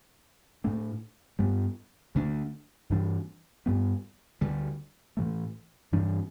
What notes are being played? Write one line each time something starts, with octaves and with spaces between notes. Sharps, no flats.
A2 A3 D4
G2 G3 B3
D2 D3 A3 D4
G2 E3 G3 D4
G2 G3 B3
D2 D3 G3
A2 E3 A3
G2 E3 G3 D4